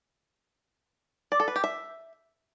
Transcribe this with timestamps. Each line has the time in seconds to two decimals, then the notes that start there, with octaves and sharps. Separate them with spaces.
1.32 D5
1.40 A4
1.48 B4
1.56 G4
1.64 E5